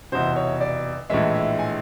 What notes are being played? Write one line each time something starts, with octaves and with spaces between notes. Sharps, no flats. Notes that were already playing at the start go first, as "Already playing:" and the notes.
F1 E2 B2 C5
C#5
D5
A#1 A2 E3 G#3 E5
E5
G#5